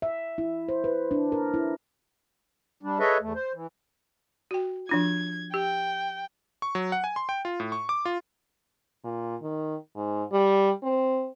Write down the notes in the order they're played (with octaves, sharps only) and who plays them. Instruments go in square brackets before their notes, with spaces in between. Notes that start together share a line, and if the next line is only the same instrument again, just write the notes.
[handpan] E5
E4
C5
B4
D4
A#4
E4
[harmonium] G3 D4
G#4 A4 B4 C#5 D#5 E5
E2 A3
C5
E3
[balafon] F#4 G5
[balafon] F3 D4 F4 [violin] G#6
[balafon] G4 [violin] G5
[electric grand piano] C#6
F#3
F#5
G#5
C6
G5
F4
A2
C#6
D6
F4
[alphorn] A#2
D#3
G#2
G3
C4